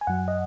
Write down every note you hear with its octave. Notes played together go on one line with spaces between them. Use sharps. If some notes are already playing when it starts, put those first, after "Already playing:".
G#5
F#2 F#3 F#5
D#5